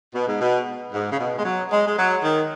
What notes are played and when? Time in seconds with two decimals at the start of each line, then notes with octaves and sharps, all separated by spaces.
0.15 B2
0.28 G#2
0.41 B2
0.93 G#2
1.12 C#3
1.20 B2
1.38 G#3
1.45 F#3
1.71 G#3
1.87 G#3
1.97 F#3
2.23 D#3